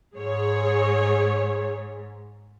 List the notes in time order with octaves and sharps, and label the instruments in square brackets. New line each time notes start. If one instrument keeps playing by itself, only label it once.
[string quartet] G#2 [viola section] G#4 C#5